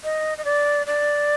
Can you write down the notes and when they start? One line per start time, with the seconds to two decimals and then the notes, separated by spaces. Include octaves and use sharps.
0.04 D#5
0.38 D#5
0.45 D5
0.87 D5